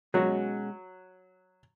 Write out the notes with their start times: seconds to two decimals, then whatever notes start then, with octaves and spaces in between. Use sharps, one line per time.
0.14 B2 F#3 G#3 C#4 F#4